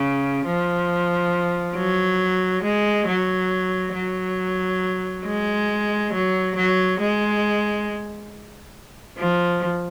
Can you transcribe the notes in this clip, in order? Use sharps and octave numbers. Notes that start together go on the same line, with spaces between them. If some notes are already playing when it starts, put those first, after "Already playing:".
Already playing: C#3
F3
F#3
G#3
F#3
F#3
G#3
F#3
F#3
G#3
F3